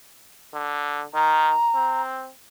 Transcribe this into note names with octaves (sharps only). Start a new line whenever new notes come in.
D3
D#3 A#5
C4